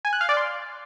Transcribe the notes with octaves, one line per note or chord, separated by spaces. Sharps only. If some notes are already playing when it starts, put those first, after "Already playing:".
G#5
F#6
F5
D5
C6